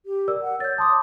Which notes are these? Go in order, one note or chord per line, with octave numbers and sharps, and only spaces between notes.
G4
A#4 D5 E6
F#5
C#5 G6 A6
A5 C6 D6 D#6